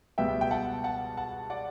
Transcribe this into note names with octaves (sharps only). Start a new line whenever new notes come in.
C#2 B2 G3 B3 E5 G5
G5
F#5 A5
F#5 A5
F#5 A5
D5 F#5